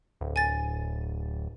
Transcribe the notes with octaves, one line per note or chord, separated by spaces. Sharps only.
D1
G#5 A6